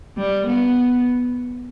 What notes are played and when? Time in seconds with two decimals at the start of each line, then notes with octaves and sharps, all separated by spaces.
0.18 G3
0.47 B3